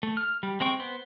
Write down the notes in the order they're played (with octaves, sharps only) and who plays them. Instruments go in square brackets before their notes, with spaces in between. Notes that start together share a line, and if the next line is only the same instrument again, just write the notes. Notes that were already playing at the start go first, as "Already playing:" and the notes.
[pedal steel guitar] A3
F6
G3
G#3 C4 G5 C#6
B3 C5